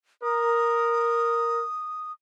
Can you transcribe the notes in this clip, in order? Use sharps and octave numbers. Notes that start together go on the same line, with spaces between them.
A#4 D#6